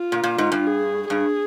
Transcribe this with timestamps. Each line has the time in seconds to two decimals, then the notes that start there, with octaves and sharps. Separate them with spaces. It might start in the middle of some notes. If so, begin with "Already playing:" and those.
Already playing: F4
0.12 A#2
0.24 A#2
0.38 G#2
0.52 G2
0.66 G#4
1.10 G2 G#4